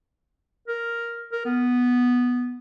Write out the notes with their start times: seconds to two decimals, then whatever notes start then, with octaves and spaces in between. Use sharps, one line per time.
0.68 A#4
1.33 A#4
1.46 B3